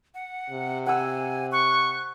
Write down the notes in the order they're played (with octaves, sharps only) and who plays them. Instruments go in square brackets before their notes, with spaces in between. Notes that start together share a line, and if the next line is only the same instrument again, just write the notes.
[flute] F#5
[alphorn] C3
[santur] F#5 E6 [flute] G#5
[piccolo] C#6 [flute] F#6